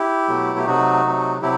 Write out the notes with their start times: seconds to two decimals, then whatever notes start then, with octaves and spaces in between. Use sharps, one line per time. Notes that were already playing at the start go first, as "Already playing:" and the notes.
Already playing: E4 G4
0.28 B2 F#3 A3
0.58 G4
0.66 C3 F#3 A3 D#4 F#4
1.04 C3 F#3 A3
1.42 C3 F#3 E4 G4